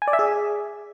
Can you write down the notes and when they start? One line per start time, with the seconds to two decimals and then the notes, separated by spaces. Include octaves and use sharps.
0.02 G#5
0.08 D5
0.13 E5
0.19 G#4